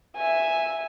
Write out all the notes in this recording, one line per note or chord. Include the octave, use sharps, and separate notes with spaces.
E5 G#5